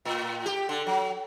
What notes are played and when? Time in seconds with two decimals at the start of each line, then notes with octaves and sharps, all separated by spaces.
0.05 A2
0.46 G4
0.69 D3
0.87 F#3